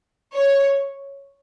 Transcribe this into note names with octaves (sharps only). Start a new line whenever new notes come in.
C#5